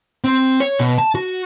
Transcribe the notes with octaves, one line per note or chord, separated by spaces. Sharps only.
C4
C#5
B2
A5
F#4